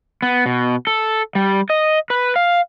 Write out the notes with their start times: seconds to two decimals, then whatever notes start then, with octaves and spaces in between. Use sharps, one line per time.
0.22 B3
0.46 B2
0.87 A4
1.35 G3
1.70 D#5
2.10 B4
2.36 F5